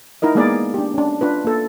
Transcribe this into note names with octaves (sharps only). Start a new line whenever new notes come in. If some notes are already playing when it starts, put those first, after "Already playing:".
D#4 E4 A#4 D#5
G#3 A#3 B3 G#4 A#4 D5
D4 G4
C#4 D4
D4 F4 B4
A#3 A4